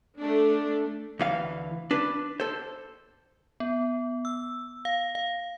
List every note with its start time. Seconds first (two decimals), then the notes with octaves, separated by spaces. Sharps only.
0.20 A3 D4
1.19 D2 E3 F5
1.91 D4 B4
2.40 A4 C5
3.60 B3
4.25 E6
4.85 F5
5.15 F5